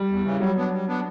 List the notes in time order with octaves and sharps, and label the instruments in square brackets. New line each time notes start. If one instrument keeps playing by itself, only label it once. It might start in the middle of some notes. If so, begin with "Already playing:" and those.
Already playing: [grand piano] G3
[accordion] E2
C#3 E3
[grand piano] F#3 [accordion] G3
[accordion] B3 D4
G3
B3 D4